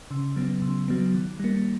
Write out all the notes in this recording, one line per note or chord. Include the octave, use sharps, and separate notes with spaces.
C#3
F#3 B3
C#3
F#3 B3
D#3
G3 A#3